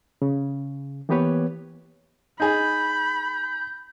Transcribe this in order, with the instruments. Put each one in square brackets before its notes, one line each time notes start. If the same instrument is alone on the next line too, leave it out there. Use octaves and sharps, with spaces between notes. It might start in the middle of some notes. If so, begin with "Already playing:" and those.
[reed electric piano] C#3
E3 A#3 B3 G4 B4 C#5
[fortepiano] D#4 G#4 [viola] B5 [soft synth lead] G6